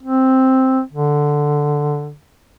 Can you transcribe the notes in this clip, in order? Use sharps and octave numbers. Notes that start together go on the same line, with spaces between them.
C4
D3